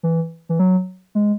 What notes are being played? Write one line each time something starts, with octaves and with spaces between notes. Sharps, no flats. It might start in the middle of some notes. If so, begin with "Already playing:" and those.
E3
E3
F#3
G#3